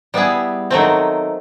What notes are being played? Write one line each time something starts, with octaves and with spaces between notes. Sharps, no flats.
G3 B3 E4 G#4
D#3 F#3 A3 C4